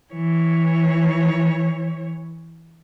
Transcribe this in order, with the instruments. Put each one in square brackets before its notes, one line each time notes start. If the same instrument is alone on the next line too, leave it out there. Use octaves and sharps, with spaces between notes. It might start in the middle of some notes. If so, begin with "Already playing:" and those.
[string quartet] E3 C#5